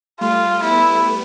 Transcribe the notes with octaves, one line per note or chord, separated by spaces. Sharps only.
G3 A3 F4
A3 B3 E4